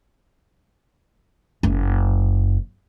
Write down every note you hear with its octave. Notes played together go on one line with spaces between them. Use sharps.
F#1